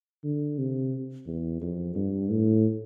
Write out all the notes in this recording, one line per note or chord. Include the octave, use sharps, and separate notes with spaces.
D3
C3
E2
F2
G2
A2